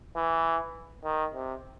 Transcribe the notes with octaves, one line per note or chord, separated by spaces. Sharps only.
E3
D#3
C3